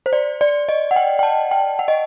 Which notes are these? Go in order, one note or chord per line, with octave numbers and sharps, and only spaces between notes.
C5
D5
D5
D#5
F#5
G5
G5
A5
G5
F#5
D#5